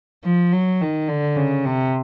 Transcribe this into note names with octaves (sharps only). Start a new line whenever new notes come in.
F3
F#3
D#3
D3
C#3
C3